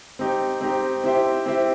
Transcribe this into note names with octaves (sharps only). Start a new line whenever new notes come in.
C4 D#4 G4
C4 D#4 G4
C4 E4 G4 C5 E5
C4 E4 G4 C5 E5